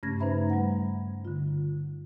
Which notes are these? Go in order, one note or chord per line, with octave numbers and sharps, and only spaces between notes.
G2 C#3 A3 C#4 G#6 A#6
D#4 B4 C5 E5 A#5 B5
G3 F#5
D3 F4